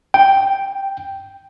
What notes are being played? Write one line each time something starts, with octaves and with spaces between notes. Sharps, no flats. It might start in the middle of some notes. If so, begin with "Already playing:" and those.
G5